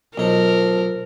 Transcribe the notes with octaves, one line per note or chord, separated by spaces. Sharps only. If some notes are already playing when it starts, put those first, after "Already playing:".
B1 D#4 F4 A#4 C5 A5